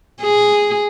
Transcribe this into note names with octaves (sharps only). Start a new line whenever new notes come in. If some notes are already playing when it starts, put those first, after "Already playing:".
G#4